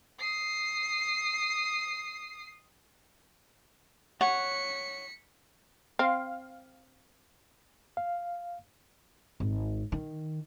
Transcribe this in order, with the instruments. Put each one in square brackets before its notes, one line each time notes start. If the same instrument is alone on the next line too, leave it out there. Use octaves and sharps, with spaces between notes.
[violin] D#6 C7
[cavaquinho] C#5 F#5 [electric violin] B6 C#7
[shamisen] C4 [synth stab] F5
[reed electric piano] F5
[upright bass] G#1
D#3